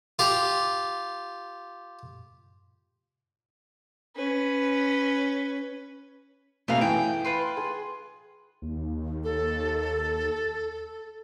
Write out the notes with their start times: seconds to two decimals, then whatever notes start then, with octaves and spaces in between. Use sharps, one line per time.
0.19 F4 G4
4.16 C#4 B4
6.68 F#2 B2 A3 B3 G#4 F5
6.81 E3 G5
7.25 F4 B4 C6
7.57 G#4
8.62 D#2
9.23 A4